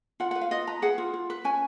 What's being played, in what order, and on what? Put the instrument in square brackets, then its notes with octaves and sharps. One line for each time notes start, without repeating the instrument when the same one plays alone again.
[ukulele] F4 F#5
F#5
B4
F5
F4 D#5
B4 A#5
G#4 F#5
F4
F4
B4
C#4 G#5